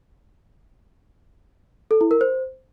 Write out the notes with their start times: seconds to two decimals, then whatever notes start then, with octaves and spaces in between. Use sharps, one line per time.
1.91 A4
2.01 E4
2.11 A#4
2.21 C5